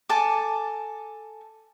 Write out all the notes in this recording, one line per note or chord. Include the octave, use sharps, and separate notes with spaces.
A4 G#5 A5 D6